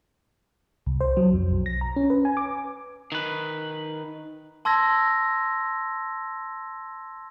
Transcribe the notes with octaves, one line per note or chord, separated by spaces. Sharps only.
C2
C5
F#3
F2
B1
A#6
A#5
C#4
B4
G#5
D6
D#3 B4
A5 C6 E6 G#6 A#6